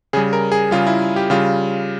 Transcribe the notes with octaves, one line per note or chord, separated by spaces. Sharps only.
C#3 G3 G#4
A#4
G#4
C#3 G3 F4
E4
G4
C#3 G3 F4